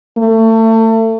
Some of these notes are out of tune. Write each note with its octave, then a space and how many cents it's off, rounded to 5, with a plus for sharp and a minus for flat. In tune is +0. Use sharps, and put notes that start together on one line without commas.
A3 +30